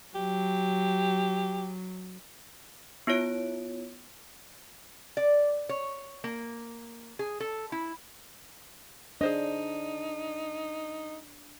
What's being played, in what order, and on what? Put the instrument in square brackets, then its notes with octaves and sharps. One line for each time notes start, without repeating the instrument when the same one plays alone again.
[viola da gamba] F#3 [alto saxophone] G4
[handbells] B3 E4 F4 C#5 D7
[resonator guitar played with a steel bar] D5
C#5
A#3
G#4
A4
E4
[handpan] D4 [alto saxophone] D#4 [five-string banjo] G#4 C5 D#5